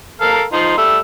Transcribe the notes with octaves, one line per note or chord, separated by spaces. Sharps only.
A4 A#4 F5
F3 D#4 C6
G3 A3 E6